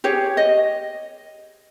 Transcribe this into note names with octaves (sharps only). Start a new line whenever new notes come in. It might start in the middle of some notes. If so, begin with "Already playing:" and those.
G4 G#4 C#5
D#5